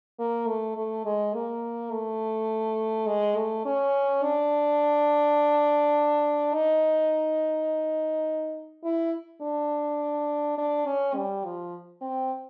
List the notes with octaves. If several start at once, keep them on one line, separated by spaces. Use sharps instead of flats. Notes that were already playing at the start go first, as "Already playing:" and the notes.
A#3
A3
A3
G#3
A#3
A3
G#3
A3
C#4
D4
D#4
E4
D4
D4
C#4
G3
F3
C4